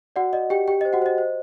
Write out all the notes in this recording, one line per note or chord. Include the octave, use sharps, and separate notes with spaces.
F#4 D5 F#5
D5 D#5
G4 G5
G4 G5
D#5
C5
F#4 F#5
C5 D#5
C5